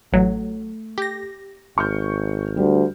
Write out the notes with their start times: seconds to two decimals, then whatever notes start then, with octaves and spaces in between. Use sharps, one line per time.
0.12 A1 F#3 A3
0.98 G4 A#6
1.78 G#1 C#6 F6 G6
2.57 D2 G3